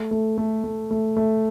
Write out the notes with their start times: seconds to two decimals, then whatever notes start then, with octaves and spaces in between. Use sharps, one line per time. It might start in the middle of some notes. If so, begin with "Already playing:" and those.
Already playing: A3
0.11 A3
0.38 A3
0.64 A3
0.91 A3
1.17 A3